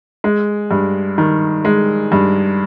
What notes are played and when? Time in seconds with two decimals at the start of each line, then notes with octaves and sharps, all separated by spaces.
0.24 G#3
0.71 G2
1.18 D#3
1.65 G#3
2.12 G2